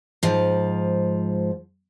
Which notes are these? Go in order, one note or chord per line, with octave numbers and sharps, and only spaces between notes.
G#2 F3